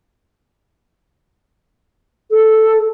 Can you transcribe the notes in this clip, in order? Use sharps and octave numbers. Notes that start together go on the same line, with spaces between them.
A4